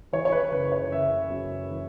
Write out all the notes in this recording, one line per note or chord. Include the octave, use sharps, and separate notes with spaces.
E3 C#5
C#5
B4
F#1 B4
C#5
F#1 E5
F#2
E3